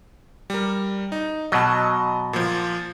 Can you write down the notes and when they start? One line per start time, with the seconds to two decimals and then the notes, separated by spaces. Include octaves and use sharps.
0.50 G3 A#4
1.12 D#4
1.52 B2 F#3 D#5 A5
2.33 A#2 F3